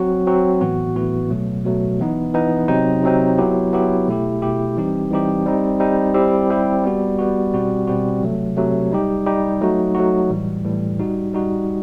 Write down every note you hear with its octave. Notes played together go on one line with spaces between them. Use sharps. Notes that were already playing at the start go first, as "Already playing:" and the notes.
Already playing: F#3 C4 F#4
F#3 C4 F#4
A2 E3 B3 F#4
A2 E3 B3 F#4
B2 F#3 A3
B2 F#3 A3
E3 B3 D#4
E3 B3 D#4
C3 F#3 C4 D#4
C3 F#3 C4 D#4
F#3 B3 E4 G4
F#3 B3 E4 G4
B2 A3 E4 G4
B2 A3 E4 G4
E3 G3 C4 D#4 G4
E3 G3 C4 D#4 G4
G3 C4 D#4
G3 C4 D#4
G3 C4 E4 G4
G3 C4 E4 G4
G3 B3 F#4
G3 B3 F#4
B2 G3 C4 F#4
B2 G3 C4 F#4
C3 F#3 A3
C3 F#3 A3
G3 D#4 G4
G3 D#4 G4
F#3 A3 D#4 F#4
F#3 A3 D#4 F#4
A2 E3 G3
A2 E3 G3
G3 D#4 F#4
G3 D#4 F#4